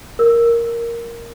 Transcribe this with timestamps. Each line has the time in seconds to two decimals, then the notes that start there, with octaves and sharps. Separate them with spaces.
0.19 A#4